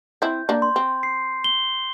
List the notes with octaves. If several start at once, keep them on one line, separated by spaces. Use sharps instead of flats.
C4 E4 G6
A#3 D4
C6
C4
C7
G7